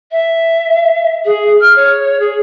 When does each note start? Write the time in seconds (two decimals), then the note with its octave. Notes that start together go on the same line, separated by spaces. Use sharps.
0.11 E5
1.25 G#4
1.60 F6
1.76 C#5
2.19 G#4